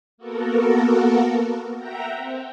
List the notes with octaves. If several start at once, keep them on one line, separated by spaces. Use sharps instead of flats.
A#3 B3 F#4 A4 A#4
E5 F#5 G5 A#5
C4